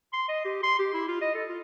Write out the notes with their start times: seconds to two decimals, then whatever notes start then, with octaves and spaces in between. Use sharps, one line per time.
0.13 C6
0.28 D#5
0.45 G4
0.63 C6
0.79 G4
0.94 E4
1.08 F4
1.21 D#5
1.35 A4
1.48 F4